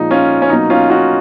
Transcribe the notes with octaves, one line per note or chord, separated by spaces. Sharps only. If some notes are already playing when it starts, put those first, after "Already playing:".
Already playing: A#2 F3 G#3 D#4
C#4 F4
C#4
B2 F#3 A#3 D#4
C#4 F4
D#4 F#4